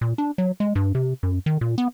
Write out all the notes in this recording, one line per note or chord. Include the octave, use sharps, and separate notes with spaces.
A#2
D4
F#3
G#3
G2
C3
F#2
D#3
A#2
B3